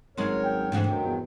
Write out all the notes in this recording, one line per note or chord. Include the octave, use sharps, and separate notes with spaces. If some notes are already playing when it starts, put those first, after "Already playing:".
G#1 F#2 G#3 A#4 C#5 C6
G5
D2 G#2 E3 G#3 C4
G2 C3 D#3 F#3
E2